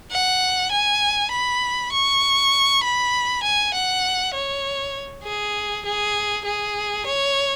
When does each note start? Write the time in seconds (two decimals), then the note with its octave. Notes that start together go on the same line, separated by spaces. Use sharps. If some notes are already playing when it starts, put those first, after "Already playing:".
0.11 F#5
0.71 G#5
1.32 B5
1.92 C#6
2.83 B5
3.43 G#5
3.74 F#5
4.34 C#5
5.24 G#4
5.86 G#4
6.45 G#4
7.06 C#5